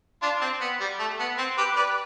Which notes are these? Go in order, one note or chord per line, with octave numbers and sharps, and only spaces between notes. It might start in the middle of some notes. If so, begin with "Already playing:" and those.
D4 F4
C4
B3
G3
A3
B3
C4
G4 B4
B4 D5